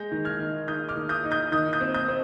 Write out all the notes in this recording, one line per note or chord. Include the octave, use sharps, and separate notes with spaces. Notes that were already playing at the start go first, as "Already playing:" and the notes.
Already playing: G#3 G6 A#6
D#3
F6 G#6
D#3
D#3 D#6 G6
D6 F6
D#3
D#6 G6
D#4
D#6 G6
D#3 D#6 G6
D#6 G6
C4
D#6 G6
C4